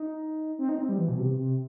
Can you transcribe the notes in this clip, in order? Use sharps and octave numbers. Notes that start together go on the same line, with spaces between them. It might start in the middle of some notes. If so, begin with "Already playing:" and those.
Already playing: D#4
C4
D#4
C4
G3
E3
B2
C3
C3